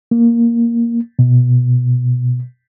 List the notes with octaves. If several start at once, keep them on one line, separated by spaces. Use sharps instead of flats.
A#3
B2